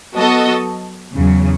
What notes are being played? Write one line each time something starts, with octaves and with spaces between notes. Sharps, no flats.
F#3 B3 F#4 A4 D#5
E2 C#3 F#3